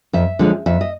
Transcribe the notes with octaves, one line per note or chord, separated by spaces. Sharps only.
F2 E5
D3 F3 G#3 C#4
F2 E5
D#5